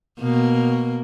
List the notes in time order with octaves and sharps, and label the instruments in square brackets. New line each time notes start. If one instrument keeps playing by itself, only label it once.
[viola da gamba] B2 A#3